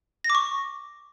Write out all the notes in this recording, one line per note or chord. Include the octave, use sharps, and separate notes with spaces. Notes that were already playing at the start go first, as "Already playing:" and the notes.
A#6
D6
C#6